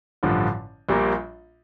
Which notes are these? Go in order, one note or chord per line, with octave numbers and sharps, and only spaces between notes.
A1 G2 D3 F3
A#1 A#2 G3 A#3